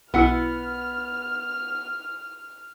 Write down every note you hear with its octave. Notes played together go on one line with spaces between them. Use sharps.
B1 B3 E4 F#5 E6 F6